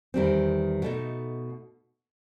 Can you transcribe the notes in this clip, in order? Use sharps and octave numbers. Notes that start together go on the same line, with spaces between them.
E2 D#3 G3 C4
B2 A3 D#4